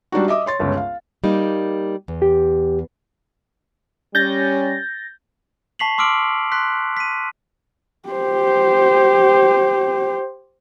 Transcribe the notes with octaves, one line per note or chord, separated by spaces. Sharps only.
G3 D4 D#4 F#4
D#5 E5 D6 D#6
C#5 C6 A6
G1 C#2 C#3
F5
G3 A#3 D#4
E2
G4
G3 C#4 G6 A6 A#6
A5 C#6 B6 C7 F7 F#7
C6 D6 E6 F6 D7 F#7
C6 F#6 B6
B6 D#7
G4 C5